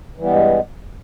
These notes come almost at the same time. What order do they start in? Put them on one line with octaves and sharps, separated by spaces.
E3 G3 B3 G2 G#3